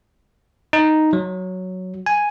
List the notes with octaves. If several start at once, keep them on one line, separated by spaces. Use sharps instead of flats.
D#4
F#3
G#5